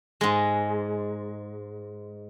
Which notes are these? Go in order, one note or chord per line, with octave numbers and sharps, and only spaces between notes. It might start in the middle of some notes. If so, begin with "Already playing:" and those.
G#2 G#3